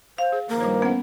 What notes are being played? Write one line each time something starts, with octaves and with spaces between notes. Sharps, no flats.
C5 F5
G#4
G2 D#3 F3 A#3
G3 C#5
B3 C#4 F#5